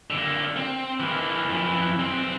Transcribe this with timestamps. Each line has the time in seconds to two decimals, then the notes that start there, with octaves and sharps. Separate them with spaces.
0.10 D3 A#3
0.57 C4
1.00 E3 A#3
1.50 F2 E3
1.99 B1 C4